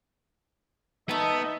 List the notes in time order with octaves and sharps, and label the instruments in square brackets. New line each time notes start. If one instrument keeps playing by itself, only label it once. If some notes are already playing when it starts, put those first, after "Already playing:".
[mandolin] A3 A5 [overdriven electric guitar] B3 [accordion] D#4 [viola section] D#5 E5